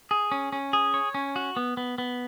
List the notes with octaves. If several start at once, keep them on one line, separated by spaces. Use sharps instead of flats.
G#4
C#4
C#4
G#4
C#5
C#4
F#4
B3
B3
B3